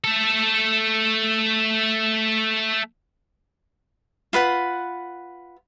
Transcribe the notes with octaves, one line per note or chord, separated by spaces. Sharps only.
A3 A4
F4 B4 F#5 B5